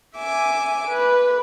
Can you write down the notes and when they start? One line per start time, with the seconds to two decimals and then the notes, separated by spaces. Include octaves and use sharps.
0.15 E5 G#5 D6
0.87 B4